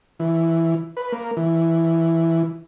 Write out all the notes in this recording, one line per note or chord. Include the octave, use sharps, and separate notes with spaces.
E3
B4
A#3
E3